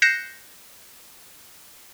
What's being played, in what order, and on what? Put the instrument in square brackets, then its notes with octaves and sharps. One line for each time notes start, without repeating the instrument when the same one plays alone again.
[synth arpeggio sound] F#6 G6 A#6 C7 C#7 E7